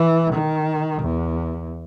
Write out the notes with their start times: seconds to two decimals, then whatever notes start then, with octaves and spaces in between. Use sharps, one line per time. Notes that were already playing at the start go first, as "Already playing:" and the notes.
Already playing: E3
0.34 D#3
1.03 E2